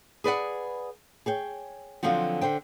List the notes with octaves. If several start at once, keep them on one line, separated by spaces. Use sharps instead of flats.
G#4 B4 D5 F#5
G#4 C#5 G5
D3 F3 F#3 C4 F#4
D3 C5 G5